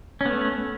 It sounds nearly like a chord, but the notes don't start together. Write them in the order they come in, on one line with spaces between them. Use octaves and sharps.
C#4 B3 A3